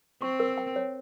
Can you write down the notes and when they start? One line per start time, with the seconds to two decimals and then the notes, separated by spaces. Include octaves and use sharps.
0.21 C4 C#6
0.40 A#4
0.58 G5
0.76 C#5